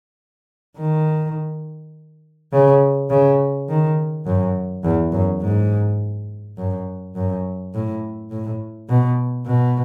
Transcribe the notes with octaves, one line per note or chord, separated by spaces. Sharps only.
D#3
C#3
C#3
D#3
F#2
E2
F#2
G#2
F#2
F#2
A2
A2
B2
B2